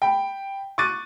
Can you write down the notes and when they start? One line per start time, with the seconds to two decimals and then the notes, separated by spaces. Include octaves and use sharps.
0.02 G5 B5
0.78 C#6 D6 F#6 A6 D#7